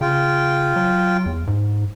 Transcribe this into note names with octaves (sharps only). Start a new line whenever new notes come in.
C#3 F4 G5
F#3
E2
G#2